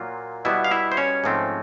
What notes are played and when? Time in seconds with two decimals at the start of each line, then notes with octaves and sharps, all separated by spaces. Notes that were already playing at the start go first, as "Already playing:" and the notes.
Already playing: A#2 F#3 A#3 F4
0.45 B2 G3 B3 E4 E5
0.64 F5
0.71 E4 E5
0.92 C5
0.97 C#4 C#5
1.24 G#2 F3 A3 C4